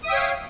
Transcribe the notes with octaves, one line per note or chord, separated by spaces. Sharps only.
C#5 E5 F5 G5 D#6